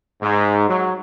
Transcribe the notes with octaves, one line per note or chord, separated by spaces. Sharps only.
G#2
F#3